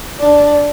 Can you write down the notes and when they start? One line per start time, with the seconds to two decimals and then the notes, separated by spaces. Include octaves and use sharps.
0.20 D4